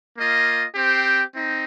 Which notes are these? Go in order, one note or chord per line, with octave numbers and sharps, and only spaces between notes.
A#3 F4 D#5
C4 G4 C5 G5
C4 D#4